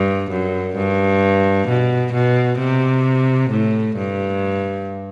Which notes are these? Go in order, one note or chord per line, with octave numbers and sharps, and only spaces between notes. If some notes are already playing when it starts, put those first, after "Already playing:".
Already playing: G2
F#2
G2
B2
B2
C3
A2
G2